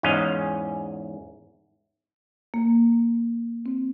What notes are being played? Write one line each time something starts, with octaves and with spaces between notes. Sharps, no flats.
E2 G#2 C#4 D#5 F5
A#3
C4